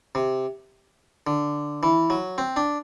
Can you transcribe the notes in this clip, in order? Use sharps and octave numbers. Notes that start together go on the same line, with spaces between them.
C3
D3
E3
F#3
C4
D4